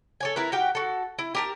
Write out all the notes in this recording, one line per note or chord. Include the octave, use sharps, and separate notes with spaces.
A4 C#5 G#5
E4 A#4 B4
F#4 G4 F5 G5
F#4 A4
E4
G4 A#4 A5